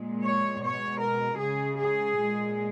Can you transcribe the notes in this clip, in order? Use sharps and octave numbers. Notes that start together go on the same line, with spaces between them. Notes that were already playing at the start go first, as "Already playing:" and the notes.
Already playing: A#2 G#3
C#5
B2 G#3 C#5
A#4
C#3 G#3 G#4
G#4
A#2 G#3